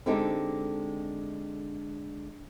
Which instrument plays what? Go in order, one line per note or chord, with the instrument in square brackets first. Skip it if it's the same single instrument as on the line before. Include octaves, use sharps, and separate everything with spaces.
[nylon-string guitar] D3 G#3 C4 D#4 G4 A4